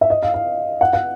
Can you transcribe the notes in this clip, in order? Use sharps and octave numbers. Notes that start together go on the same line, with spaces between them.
E5
D#5
F5
F5
F#5
F#5